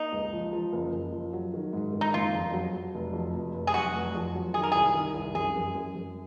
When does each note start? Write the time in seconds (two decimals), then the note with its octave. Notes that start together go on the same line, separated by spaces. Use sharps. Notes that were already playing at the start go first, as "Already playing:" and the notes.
Already playing: A#3 D#4
0.12 C#2
0.33 F3
0.53 F3
0.73 F#1
0.92 F#1
1.12 F3
1.33 F#3
1.53 D#3
1.73 G#2
1.93 D#3
2.01 D#4
2.14 F#1 F4
2.33 F2
2.54 F#3
2.73 F#3
2.94 F1
3.13 F2
3.34 F1
3.54 F1
3.67 G#4
3.74 F#3 F#4
3.95 F1
4.15 F2
4.35 F#3
4.54 D#3 G#4
4.63 A#4
4.72 C2 G#4
4.95 D#3
5.14 C2
5.35 F#2 G#4
5.56 F#2
5.75 F#2
5.96 F#2